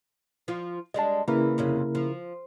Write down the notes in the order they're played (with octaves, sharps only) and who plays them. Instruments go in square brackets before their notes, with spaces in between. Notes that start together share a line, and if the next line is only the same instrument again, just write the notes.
[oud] F3 F4
[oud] G3 G#3 D4 [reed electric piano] D#5 A5
[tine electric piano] C#3 E4 A#4 [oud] E3 [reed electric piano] A#3
[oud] F2 C3 C#4
F3